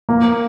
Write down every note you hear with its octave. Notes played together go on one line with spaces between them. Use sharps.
A#3